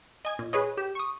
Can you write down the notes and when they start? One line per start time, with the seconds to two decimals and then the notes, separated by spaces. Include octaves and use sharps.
0.25 D#5 G#5 G#6
0.39 A#2
0.53 G#4 B4 C#5 D#5
0.77 G4 E7
0.95 C#6 D#6